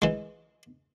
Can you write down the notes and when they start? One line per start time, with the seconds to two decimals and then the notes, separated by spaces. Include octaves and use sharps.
0.02 E3 G#3